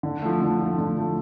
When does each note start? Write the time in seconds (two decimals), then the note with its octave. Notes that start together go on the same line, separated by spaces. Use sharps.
0.03 D3
0.22 F3 A3
0.41 D3
0.60 F3 A3
0.78 D3
0.97 F3 A3